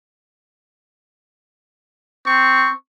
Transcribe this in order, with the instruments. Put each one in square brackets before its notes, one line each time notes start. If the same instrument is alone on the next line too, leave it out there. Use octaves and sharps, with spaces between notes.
[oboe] C4 [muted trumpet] C#6